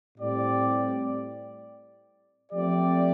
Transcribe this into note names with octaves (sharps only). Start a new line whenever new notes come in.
A2 G3 C4 G4 D5
F3 A3 C4 G4 D5